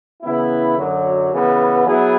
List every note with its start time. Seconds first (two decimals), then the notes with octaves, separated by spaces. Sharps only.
0.22 C#3 E3 B3 E4
0.77 F#2 D3 F#3
1.32 C#3 E3 B3
1.86 F#3 B3 E4 G#4